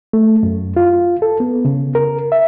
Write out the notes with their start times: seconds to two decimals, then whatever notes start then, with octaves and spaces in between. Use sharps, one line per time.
0.13 A3
0.43 F#2
0.76 F4
1.22 A4
1.40 B3
1.65 C#3
1.95 A#4
2.32 E5